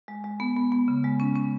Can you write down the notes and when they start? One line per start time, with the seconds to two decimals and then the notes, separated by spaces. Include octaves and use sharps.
0.08 G#3
0.24 G#3
0.40 B3
0.56 B3
0.72 B3
0.88 C#3
1.04 G#3
1.20 C#4
1.35 C#4